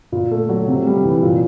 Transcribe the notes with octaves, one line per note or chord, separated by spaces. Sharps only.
A#2
A3
F#3
C3
G3
E3
A#2